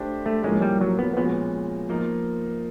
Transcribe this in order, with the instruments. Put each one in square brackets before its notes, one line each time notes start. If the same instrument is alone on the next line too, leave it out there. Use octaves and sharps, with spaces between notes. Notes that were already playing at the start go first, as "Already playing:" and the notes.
Already playing: [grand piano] A3 D4 G4 C5
[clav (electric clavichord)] A3
[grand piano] A2 F3 A#3 C#4 [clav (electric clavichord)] G#3
[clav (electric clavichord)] G3
F#3
B3
[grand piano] A#2 F3 G#3 C#4 F#4 [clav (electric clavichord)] B3
[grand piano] F3 A#3 D#4